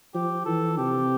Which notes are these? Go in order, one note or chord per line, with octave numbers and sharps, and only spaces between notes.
F3 G4
E3 A4
C3 G4